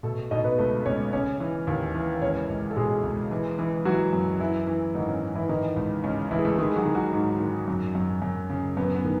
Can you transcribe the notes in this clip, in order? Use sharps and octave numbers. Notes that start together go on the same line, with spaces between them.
B2 A3 A4
B2 D#4 D#5
B3 B4
C#2 A3 A4
C#2 C#4 C#5
C#3 C#4 C#5
E3
D#2
E3
C#2 C#4 C#5
C#2
A4
B2 G#3 G#4
C#2
E3
E3
E3 F#3 F#4
F#2
E3 E4
E3
G#2 D#3 D#4
C#4
G#2
E3 E4
D#3 E3 D#4
C#2
C#2 C#4
C#2 E3 E4
G#4
A3 A4
D#3 G#3 G#4
F#3 F#4
D#3
F#3 F#4
G#2
D#3
F#2
F#2
F#2
C#3
F#2 B3
B3
D#3